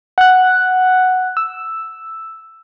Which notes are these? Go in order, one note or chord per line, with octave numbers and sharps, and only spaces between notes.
F#5 F#6
E6